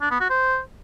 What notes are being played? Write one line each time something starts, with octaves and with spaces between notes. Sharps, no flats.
D4
B3
F#4
C5